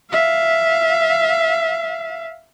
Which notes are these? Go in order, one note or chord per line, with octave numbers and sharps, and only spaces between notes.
E5 F5